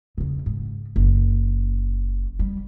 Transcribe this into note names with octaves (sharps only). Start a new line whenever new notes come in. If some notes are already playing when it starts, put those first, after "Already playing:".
E2 C#3
G#2
F#1
G3